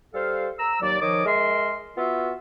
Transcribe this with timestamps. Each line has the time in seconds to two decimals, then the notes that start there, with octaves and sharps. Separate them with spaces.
0.14 G3 A4 C5 F5
0.59 A#5 E6
0.81 D#2 F#3 D5
1.01 D#3 F3 C#5 D#5 D6
1.26 G#3 A#4 E5 C6
1.97 B3 F4 F#4 E5